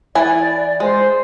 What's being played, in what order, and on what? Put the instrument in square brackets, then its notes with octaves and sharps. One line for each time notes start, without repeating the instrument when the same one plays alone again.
[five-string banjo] E3 G#5 [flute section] D5
[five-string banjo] G#3 [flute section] C5